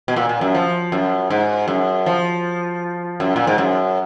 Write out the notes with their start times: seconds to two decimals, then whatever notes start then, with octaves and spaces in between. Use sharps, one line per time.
0.08 B2
0.16 A#2
0.29 A#2
0.41 F#2
0.55 F3
0.92 F#2
1.30 G#2
1.68 F#2
2.06 F3
3.20 F#2
3.36 A#2
3.47 G#2
3.58 F#2